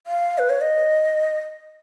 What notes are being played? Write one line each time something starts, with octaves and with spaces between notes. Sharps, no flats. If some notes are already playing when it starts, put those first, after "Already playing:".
F5
B4
C#5
D#5